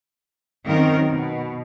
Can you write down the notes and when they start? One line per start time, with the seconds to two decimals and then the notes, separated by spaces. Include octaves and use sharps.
0.64 F#2 D#3 C4 A#4
1.07 B2